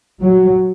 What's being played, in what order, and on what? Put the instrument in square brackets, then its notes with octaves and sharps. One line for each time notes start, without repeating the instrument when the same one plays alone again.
[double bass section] F#3